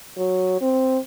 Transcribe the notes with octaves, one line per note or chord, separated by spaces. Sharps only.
F#3
C4